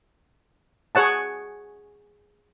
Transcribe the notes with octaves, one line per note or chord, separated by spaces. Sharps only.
G#4 C#5 F#5 A5